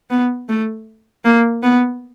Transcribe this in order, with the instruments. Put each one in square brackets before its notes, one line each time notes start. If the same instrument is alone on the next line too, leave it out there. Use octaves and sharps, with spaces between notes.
[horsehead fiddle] B3
A3
A#3
B3